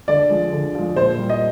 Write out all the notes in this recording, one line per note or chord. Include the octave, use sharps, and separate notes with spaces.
D3 D5
F3 G#3
D3
F3 G#3
A#2 C5
G3
D#5